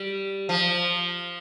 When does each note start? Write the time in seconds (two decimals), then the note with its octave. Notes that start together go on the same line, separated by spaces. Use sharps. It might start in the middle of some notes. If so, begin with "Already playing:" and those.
Already playing: G3
0.49 F3